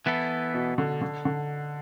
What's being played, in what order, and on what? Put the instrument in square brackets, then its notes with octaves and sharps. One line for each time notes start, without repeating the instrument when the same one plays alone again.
[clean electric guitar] E3 B3 E4 A4
[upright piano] B2
D3
D3
D3